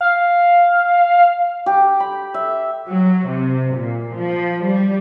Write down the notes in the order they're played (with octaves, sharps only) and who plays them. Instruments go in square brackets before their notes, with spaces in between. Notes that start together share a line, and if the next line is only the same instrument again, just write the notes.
[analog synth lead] F5
[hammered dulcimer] G4
B5
E5
[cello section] F#3
C3
A#2
F3
G3